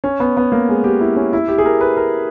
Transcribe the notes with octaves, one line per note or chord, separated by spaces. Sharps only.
C#4
B3
B3
A#3
G#3
G4
E4
C#4
E4
G4
G#4
A#4
B4
A#4